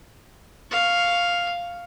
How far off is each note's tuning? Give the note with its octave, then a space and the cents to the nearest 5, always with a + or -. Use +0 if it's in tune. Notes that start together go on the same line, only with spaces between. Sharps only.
F5 +0 C#6 +0